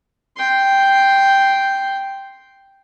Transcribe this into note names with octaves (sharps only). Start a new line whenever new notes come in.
G5 C6